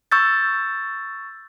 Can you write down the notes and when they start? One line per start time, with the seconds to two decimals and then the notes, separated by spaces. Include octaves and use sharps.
0.12 C#6 E6 G6 A6